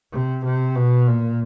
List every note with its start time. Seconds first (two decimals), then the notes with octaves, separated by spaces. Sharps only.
0.12 C3
0.44 C3
0.76 B2
1.07 A#2